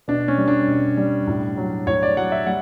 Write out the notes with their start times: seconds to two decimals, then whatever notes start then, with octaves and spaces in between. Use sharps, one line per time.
0.08 B2 D4
0.28 C#4
0.38 G3
0.48 D4
0.68 B2
0.97 G3
1.27 A2
1.57 F#3
1.87 A2 C#5
2.03 D5
2.17 F#3 F#5
2.32 E5
2.47 G3 F#5